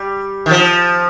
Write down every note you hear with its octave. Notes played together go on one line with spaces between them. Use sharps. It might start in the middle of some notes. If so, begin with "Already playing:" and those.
Already playing: G3
D#3
F3